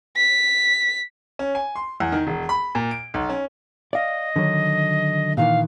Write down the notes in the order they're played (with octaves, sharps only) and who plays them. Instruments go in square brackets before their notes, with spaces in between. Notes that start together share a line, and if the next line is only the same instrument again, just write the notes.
[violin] B6
[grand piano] C#4
G#5
C6
E2
D#3
E1
B5
A#2
D7
B1
C#4
[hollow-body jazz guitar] D5 F5 [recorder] D#5
[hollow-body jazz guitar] D3 D#3 F#3
[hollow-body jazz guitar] A#2 D#3 E3 [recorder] F5